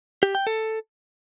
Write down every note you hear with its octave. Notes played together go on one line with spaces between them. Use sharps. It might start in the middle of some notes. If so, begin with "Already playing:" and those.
G4
G5
A4